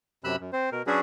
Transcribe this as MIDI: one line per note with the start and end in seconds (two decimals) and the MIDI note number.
0.24 0.36 42
0.24 0.36 48
0.24 0.36 83
0.24 0.36 88
0.24 0.36 90
0.40 0.51 42
0.53 0.70 60
0.53 0.70 72
0.72 0.82 47
0.72 0.82 70
0.87 1.01 54
0.87 1.01 61
0.87 1.01 62
0.87 1.01 66
0.87 1.01 68
0.87 1.01 71